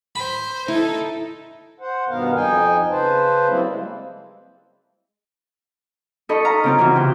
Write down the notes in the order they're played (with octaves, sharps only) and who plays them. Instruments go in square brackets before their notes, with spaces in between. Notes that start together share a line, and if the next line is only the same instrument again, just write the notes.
[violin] C5 [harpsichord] B5
[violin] D#4 A4 [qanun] E4
[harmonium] C5 F#5
G2 B2 D#3 B3 A#4 F5
F2 D#4 G5 G#5
C#3 B4 C5 A5
F#3 G3 A#3 C4 E4
G#3
[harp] D#4 A4 D#5 B5 C#6
F5 A#5
C#3 C4 F4
C#3 E3 F#4
C3 G5